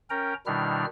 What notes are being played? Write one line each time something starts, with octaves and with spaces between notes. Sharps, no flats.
C#4 A#4 G5 A#5
B2 D#3 G3 D4 E4 F6